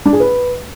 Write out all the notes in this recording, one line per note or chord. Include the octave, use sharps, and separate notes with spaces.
D4
G#4
B4